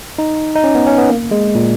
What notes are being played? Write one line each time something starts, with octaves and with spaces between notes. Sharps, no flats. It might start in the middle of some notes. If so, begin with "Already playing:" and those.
D#4
D#4
C#4
B3
C#4
B3
A#3
G#3
A#2